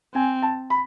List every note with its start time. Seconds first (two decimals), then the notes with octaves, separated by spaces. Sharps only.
0.14 C4 G#5
0.42 A5
0.70 B5